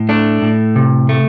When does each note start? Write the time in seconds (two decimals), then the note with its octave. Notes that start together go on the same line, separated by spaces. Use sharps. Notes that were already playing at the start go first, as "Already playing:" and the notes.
Already playing: A2
0.09 A3 D4
0.42 A2
0.76 C3
1.09 A3